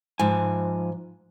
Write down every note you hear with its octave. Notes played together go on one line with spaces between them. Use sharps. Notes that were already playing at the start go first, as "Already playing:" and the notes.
G#2 F3 G#5